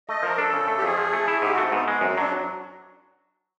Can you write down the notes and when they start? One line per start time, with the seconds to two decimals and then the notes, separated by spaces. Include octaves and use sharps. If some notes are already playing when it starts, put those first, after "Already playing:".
0.09 A3 D#5
0.23 F3 A#4
0.38 D4 A4
0.53 C#3
0.68 A3
0.78 G4
0.83 F2 G#4
0.97 F3
1.13 A3
1.28 E4
1.42 G#2 G4
1.53 F#4
1.58 A3 C4
1.72 G#2 B3
1.88 G#3 B3
2.01 F#2 C4
2.17 F#3 D4